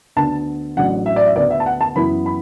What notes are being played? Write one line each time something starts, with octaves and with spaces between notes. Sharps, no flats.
D2 D3 B3 D4 A5
A1 A2 F#3 D4 F#5
E5
D5
E5
D2 D3 B3 D5
E5
A5
F#5
A5
F#2 E3 B3 E4 B5
B5